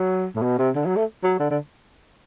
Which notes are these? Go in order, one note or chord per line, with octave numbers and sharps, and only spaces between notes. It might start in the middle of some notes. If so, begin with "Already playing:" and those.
Already playing: F#3
A2
B2
C3
D3
F#3
A3
F#3
D3
D3